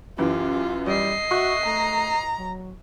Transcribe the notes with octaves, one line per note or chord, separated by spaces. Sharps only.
F#2 E3 F4 G4
G3 D#5 C7
F#4 E5 C#6 F#6
A3 A#5
F#3